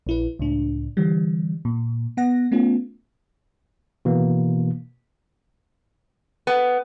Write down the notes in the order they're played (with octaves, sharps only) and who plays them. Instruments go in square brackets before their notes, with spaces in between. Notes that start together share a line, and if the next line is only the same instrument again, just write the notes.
[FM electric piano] A#1 E4 B4
C#2 A2 D4
D3 E3 G3
A#2
B3 F#5 A#6
A3 B3 C#4 F4
[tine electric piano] B2 E3 A#3
[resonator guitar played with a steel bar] B3